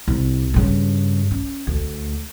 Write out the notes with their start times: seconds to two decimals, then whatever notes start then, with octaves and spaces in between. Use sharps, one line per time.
0.08 C2
0.54 G2 C#3
1.31 C#4
1.67 D2